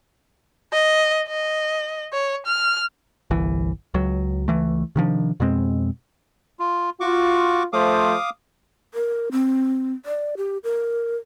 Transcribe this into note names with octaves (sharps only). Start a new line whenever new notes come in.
D#5
D#5
C#5
F6
G1 C2 E3
C#2 F#3
C#2 E3 A3
C3 D#3 F3 D4
F2 B2 G#3 C4
F4
F4 F#4 C#6 D6
F3 A3 C5 F5 D6 D#6
A#4
C4
D5
G4
A#4